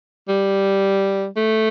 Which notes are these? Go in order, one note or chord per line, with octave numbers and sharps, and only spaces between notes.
G3
A3